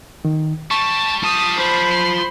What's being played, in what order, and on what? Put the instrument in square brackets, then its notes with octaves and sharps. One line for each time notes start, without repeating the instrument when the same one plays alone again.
[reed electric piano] D#3
[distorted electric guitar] G3 [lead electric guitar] A5 [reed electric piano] C#6
[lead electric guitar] F4 A5 [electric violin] D#6
[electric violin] C5 B5
[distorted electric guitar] C6